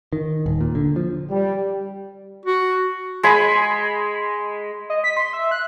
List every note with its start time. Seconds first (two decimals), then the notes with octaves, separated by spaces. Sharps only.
0.13 D#3
0.46 D#1
0.61 A#2
0.75 D3
0.96 F3
1.31 G3
2.46 F#4
3.23 G#3 G#5 B5
4.90 D#5
5.04 B6
5.17 C6
5.33 E5
5.51 F#6